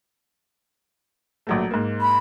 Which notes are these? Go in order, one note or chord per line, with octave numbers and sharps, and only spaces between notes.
A#1 F#3 A3
G#2 A#3
B5